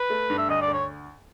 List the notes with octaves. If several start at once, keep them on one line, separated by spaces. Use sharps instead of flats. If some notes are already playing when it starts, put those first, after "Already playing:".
Already playing: B4
A3
G2
E5
D2 D#5
D5
D2
C#5